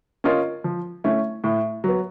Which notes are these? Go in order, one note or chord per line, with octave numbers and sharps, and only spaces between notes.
C#4 F4 A#4 D#5
F3
A3 C#4 E4
A2
F#3 B3